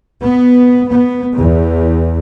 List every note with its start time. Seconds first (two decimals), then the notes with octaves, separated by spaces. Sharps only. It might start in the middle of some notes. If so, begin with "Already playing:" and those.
0.24 B3
0.89 B3
1.38 E2